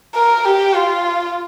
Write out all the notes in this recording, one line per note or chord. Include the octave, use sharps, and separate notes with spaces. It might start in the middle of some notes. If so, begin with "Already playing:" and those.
A#4
G4
F4